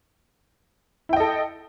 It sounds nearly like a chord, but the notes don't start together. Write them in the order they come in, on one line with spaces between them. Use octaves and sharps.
E4 G5 D#5 A4